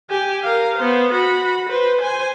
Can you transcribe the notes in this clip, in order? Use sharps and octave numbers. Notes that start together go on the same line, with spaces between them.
G4 G#5
A#4 F5
B3 C5
F#4 B5
B4 C5
C5 G#5